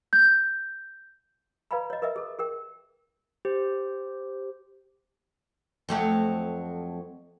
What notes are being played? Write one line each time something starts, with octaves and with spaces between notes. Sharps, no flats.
G6
B4 D5 F5 G#5 A#5 B5
C#5 D#5
A#4 B4 D#5 E5 G#5
G#4 A4
G#4 A#4 G5
G4 C5
F2 F#3 A3